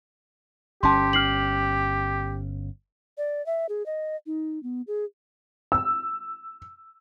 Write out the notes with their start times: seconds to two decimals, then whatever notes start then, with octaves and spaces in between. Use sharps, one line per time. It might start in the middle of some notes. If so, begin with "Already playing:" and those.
0.83 G1 C#4 G4 A5 C6
1.13 F6 C7 F#7
3.18 D5
3.46 E5
3.69 G#4
3.86 D#5
4.26 D#4
4.63 B3
4.87 G#4
5.72 E6